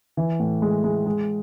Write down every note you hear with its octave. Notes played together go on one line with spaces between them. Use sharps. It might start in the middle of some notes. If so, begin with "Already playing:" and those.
E3
A2
G#3
G#3
G#3